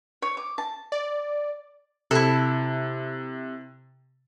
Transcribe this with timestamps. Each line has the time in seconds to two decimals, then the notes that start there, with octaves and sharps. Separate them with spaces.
0.22 C#5
0.37 D6
0.58 A5
0.92 D5
2.11 C3 E4 A4